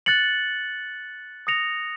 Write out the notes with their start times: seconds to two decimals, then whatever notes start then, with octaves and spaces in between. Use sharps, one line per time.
0.06 F#6 A6 C#7 F#7
1.47 D#6 A#6 C#7 F7